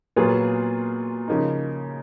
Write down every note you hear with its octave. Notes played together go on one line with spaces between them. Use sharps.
A#2 F#3 B3 F4 G#4
C#3 F3 A#3 D#4